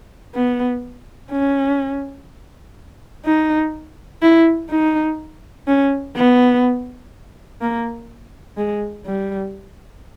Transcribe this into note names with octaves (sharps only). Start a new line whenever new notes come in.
B3
C#4
D#4
E4
D#4
C#4
B3
A#3
G#3
G3